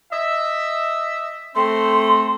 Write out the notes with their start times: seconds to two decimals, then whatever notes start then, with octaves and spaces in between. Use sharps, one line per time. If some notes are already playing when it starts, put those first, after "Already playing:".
0.12 D#5 E5
1.56 A3 C4 C6